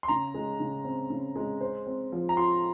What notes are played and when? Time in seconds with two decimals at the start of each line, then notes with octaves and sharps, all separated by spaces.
0.03 C6
0.08 C#3 A#5
0.34 G#3
0.60 C#3
0.84 C4
1.10 C#3
1.35 G#3
1.61 C5
1.86 C4
2.12 F3
2.29 A#5
2.37 F4 C6